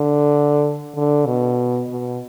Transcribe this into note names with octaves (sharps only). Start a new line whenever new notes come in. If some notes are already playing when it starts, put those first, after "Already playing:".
Already playing: D3
D3
B2
B2